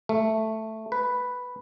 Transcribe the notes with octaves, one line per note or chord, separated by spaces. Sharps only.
A3
B4